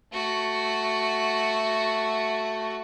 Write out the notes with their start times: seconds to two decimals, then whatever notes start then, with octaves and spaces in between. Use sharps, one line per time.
0.12 A3 F#4